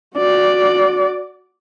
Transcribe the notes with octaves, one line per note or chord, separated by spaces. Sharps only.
F#4 D5